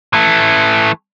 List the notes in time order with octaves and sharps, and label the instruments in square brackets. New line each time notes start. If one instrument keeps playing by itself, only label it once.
[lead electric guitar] E3 A3